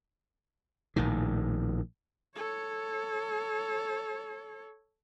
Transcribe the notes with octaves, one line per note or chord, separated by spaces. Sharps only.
A#1 A2 D#3
A4 C#5